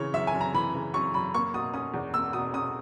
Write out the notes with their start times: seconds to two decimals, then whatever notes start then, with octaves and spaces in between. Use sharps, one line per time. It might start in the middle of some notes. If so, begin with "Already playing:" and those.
Already playing: C#3 E3 C#5
0.14 F#2 E5
0.27 G#5
0.34 F#2
0.41 A#5
0.54 E3 B5
0.74 C#3
0.94 F#2 C#6
1.14 F#2 B5
1.34 A#3 C#6
1.54 B2 D#6
1.74 C#4 D#6
1.94 E2
2.14 A#3 E6
2.33 B2 D#6
2.53 C#4 D#6